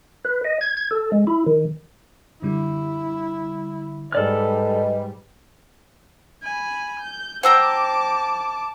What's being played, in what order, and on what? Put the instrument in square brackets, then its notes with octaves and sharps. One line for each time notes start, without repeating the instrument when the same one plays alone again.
[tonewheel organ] B4
D#5
G#6
G#6
A4
G#3
E4
D#3
[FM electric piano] F#2 D3 G3 [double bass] E4
[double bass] G#2 G3 [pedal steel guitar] A4 D5 F6 [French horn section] B4 D#5
[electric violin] G#5 B5
G6
[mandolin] C5 G5 A#5 [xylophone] F#5 E6 [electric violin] A5 D6